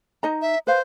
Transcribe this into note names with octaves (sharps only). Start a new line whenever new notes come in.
D#4 D#5 A#5
E5
B4 C5 F5